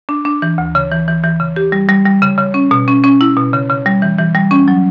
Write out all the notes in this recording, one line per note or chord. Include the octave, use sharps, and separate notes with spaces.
D4
D4
E3
D2
C#3
E3
E3
E3
C#3
G4
G3
G3
G3
C#3
C#3
C#4
B2
C#4
C#4
E4
B2
C#3
C#3
G3
E3
E3
G3
C#4
F#3